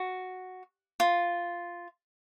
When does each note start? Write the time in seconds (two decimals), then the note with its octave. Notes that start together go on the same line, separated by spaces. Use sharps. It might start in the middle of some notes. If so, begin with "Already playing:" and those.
Already playing: F#4
1.00 F4